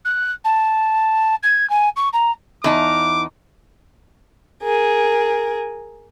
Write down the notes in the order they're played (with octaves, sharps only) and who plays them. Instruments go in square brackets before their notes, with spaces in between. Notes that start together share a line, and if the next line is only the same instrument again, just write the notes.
[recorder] F#6
A5
G#6
G#5
C#6
A#5
[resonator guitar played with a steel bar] E2 D#4 A5 [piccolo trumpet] D6
[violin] G#4 A#4